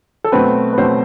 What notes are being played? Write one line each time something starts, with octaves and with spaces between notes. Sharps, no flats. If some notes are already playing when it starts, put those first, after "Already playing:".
A4
B2 F#3 A3 C4 B4
B4
B2 F#3 A3 C4 C5